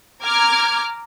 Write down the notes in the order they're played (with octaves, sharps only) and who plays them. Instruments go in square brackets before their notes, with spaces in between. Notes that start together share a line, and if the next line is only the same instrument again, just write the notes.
[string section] A#5 D6 F6 G#6